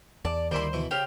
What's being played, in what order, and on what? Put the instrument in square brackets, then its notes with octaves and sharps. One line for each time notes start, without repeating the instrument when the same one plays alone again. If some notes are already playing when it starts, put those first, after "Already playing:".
[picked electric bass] E2 [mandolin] D5 [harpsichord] A5
[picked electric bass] D2 D#3 [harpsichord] G3 A#3 E4 [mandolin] C5 C6
[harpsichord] B2 E3 E4
[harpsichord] C#3 C5 [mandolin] G4 F5